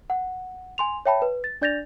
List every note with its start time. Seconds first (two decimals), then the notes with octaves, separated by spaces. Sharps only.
0.10 F#5
0.78 G#5 C6 F7
1.06 C#5 E5 G5 A5 B5
1.22 B4
1.44 A6
1.61 D4 D5 G6 A6 A#6 F7